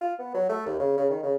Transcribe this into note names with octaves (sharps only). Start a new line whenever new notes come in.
F4
B3
F#3
A3
D#2
C#3
C#3
D#3
C#3